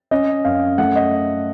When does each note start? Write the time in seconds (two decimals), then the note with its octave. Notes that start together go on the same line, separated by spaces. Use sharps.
0.11 C#4 D#5
0.45 F#2 F5
0.78 A3 F#5
0.96 D#5